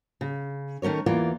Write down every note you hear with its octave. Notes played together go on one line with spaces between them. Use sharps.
C#3
D#3 A3 C#4 A#4 C#5
E2 E3 A#3 F4 D5